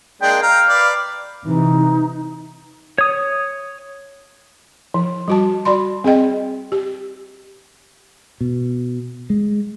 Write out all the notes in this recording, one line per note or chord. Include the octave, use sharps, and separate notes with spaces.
G#3 A#3 D4 G5
F5 G5 A#5
B4 D5
C3 E3 D#4
C#5 D#6
F3
G3 F#4 A5
F#4 D5 B5 C6
C4 G#4 D#5 G5
G4
B2
G#3